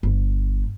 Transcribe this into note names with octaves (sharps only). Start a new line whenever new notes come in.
G1